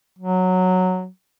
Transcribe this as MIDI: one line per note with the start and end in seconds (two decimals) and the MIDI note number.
0.19 1.07 54